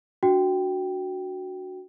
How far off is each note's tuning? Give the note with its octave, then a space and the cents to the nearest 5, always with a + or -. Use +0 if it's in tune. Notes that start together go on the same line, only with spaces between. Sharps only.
D4 +0 F#4 +0 G5 +0